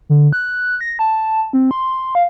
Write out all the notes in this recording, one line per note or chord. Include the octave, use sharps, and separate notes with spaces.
D3
F#6
A#6
A5
C4
C6
F5